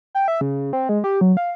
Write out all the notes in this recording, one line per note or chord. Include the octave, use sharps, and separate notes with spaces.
G5
E5
C#3
C4
G#3
G4
F#3
F5